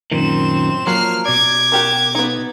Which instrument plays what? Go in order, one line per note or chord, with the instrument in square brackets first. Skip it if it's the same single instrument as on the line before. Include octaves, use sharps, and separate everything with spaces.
[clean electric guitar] F#2 A#2 D#3 [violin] C4 E7
[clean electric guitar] F3 A#3 [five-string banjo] F#3 [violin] F6 C7
[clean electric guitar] B2 D5 [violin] D6 G#6
[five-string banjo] F#4 G4 A#4
B3 D#4